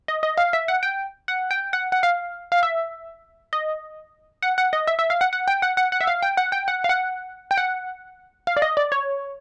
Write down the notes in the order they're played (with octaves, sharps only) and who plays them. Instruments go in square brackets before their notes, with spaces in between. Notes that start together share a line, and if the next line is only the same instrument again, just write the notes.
[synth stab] D#5
D#5
F5
E5
F#5
G5
F#5
G5
F#5
F#5
F5
F5
E5
D#5
F#5
F#5
D#5
E5
E5
F5
F#5
F#5
G5
F#5
F#5
F#5
E5
F5
G5
F#5
G5
F#5
F5
F#5
G5
F#5
F5
D5
D#5
D5
C#5